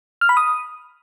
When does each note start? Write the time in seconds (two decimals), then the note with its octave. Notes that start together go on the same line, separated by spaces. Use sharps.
0.21 F6
0.29 B5
0.37 D#6